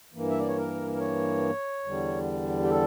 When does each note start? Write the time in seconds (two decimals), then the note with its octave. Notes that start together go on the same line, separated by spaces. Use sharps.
0.14 G2 E3 A#3
0.30 E5
0.39 D5
0.48 C#5
0.57 A#4
0.94 A#4
1.00 C#5
1.85 E2 D3 G3
2.63 G4
2.70 A4